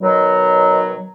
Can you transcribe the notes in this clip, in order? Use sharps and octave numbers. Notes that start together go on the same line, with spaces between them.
B2 D#3 F#3